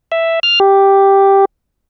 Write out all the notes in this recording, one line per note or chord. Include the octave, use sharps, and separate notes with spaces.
E5
F6
G4